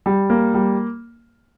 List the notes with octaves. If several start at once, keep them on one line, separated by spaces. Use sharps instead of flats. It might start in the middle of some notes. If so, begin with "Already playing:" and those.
G3
A#3
G3